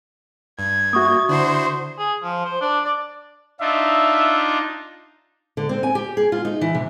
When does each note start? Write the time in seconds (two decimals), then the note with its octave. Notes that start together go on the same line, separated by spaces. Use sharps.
0.59 G2 G#6
0.93 A#3 F#4 E5 C#6 D#6
1.29 D3 D4 E4 F#4 C5
1.98 G#4
2.23 F3
2.45 C5
2.61 D4
2.84 D5
3.60 D4 D#4 F4 E5
5.57 D3
5.69 C4
5.83 G#5
5.95 G4
6.17 G#4
6.32 F4
6.45 D#4
6.61 E3
6.75 C3